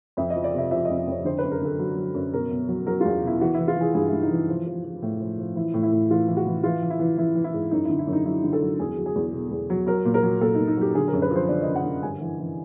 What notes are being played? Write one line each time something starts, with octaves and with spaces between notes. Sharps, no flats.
F2 E5
D#5
F3
D5
C3 E5
F3 E5
F2 D#5
E5
F2 C#5
D3 C5
B4
F#2
A#4
D3 A4
F#3
F#3
F#2
B2 A#4
B2
F#3
F#3 A#4
E2 F4
B2 E4
E3 F#4
E3 E4
F4
E3 G#4
G2 G#4
G2 E4
D#4
E3
F3
F3
F3
A2
F3
F3
E3 E4
A2
E4
A2
E3 F4
E3
F#4
E3
E3 F4
E3
E4
E3
E3 E4
E3
E4
G#2
F#2 D#4
D3 E4
E4
F#2
D#4
F#3 E4
D3
A4
F#3
E2 G#4
F#3
G#4
E2
B2
E2
F#3
F#3 A#4
A#2
A#4
F#3
A#2 A4
D#4
A#2
D#4
F#3 G4
D3 G#4
A#4
F#2
B4
F3 C5
D3 D5
F#2 D#5
F#5
D3
G2 G#5
E3
E3